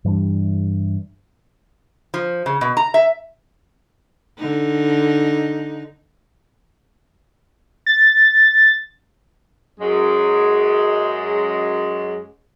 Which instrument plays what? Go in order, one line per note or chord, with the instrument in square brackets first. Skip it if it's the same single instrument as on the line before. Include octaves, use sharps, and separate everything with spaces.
[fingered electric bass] G2 E3 G3 D4
[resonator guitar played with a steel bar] F3
C#3
B2
A#5
E5
[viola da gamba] D3 D#4
[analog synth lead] A6
[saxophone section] F#2 G#3